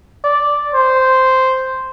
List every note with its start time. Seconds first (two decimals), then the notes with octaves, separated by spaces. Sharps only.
0.24 D5
0.74 C5